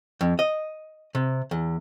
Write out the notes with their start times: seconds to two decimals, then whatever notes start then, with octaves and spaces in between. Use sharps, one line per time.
0.21 F2
0.39 D#5
1.15 C3
1.51 E2